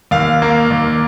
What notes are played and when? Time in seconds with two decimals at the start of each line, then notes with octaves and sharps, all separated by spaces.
0.11 D#2 F5
0.42 A#3
0.70 D#2